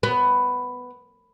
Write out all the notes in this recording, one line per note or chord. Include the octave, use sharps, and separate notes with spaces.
B3